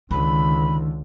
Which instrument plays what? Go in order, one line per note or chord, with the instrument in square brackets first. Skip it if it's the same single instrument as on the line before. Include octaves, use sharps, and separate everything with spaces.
[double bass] C#2 D3 [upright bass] D#3 [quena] B5